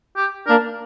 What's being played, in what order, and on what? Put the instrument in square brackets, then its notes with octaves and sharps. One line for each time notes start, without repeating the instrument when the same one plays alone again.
[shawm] G4
[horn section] A#3 D4 [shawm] A#4